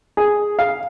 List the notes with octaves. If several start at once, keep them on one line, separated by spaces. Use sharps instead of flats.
G#4
F5